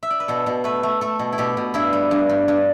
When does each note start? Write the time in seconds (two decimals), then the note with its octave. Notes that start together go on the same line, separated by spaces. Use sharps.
0.03 E5
0.10 D5
0.20 B4
0.28 B2 A4
0.46 B2
0.64 A3 B4
0.83 A3
1.01 A3 A4
1.19 B2
1.33 E4
1.38 B2 G4
1.57 B2
1.74 G2 E4
1.93 G3
2.11 G2
2.29 G2
2.48 G2